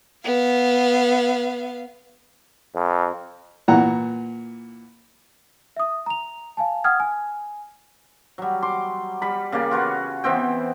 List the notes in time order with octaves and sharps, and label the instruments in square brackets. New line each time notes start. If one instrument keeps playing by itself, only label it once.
[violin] B3 F5
[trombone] F2
[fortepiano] A#2 E3 F#5 A#5
[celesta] E5 D#6
A#5 F7
F5 G#5 A5
F#5 G5 D#6 F6 G#6
G#5
[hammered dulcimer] F#3 G3
C6 D6
G3 B5
C#3 A#3 G4 D5
F4 F#4 B4 C#5
E3 B3 C4 G5